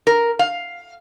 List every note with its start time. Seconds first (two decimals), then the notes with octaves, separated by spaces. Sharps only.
0.07 A#4
0.39 F5